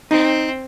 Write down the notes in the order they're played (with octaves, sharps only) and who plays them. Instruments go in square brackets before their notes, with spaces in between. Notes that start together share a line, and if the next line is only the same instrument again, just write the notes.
[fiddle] C4 [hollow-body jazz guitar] D#4